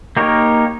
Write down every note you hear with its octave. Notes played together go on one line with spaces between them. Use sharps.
A#3 D#4 G4 A#4 C#5